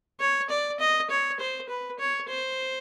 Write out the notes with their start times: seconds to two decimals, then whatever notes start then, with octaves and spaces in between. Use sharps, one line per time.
0.20 C#5
0.50 D5
0.80 D#5
1.10 C#5
1.40 C5
1.69 B4
1.99 C#5
2.29 C5